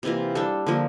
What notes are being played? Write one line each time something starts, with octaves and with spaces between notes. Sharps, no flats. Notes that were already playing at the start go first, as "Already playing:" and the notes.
C3 E3 A#3 F4
G3 D4 A4
D3 F3 A#3